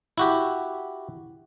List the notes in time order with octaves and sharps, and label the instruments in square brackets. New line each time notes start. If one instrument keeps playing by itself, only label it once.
[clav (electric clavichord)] E4 F#4 G4